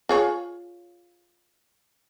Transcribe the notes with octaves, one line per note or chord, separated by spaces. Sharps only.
F4 G#4 C#5